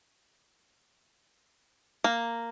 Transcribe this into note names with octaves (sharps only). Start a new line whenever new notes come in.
A#3